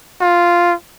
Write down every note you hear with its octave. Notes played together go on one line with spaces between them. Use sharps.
F4